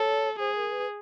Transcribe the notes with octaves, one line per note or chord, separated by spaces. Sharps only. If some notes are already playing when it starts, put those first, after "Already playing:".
Already playing: A4 C#5
G#4 C5
A#4
B4